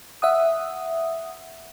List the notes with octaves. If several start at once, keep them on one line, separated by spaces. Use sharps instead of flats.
E5 F#5 D#6